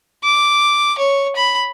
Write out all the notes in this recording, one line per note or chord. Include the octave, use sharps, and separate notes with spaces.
D6
C#5
B5